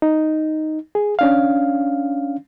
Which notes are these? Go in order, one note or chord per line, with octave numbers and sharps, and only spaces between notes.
D#4
G#4
C#4 D4 F5